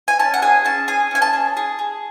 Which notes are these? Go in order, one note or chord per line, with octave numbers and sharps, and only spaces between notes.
G#5
C#4 A5
F#5
G#4 G#5
C#4 A5
G#4 G#5
C#4 G#5
A5
G#4
G#4
G#4